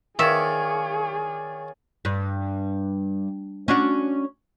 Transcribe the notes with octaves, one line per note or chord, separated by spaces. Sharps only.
D#3 G#4 C#5 D5 E5 F5
G2
C#4 D4 F#4